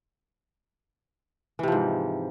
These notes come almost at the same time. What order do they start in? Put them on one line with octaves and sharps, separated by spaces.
E3 C3 F3 G#2